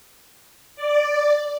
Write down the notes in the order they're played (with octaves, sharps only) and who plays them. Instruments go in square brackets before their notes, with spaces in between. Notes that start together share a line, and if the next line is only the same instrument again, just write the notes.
[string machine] D5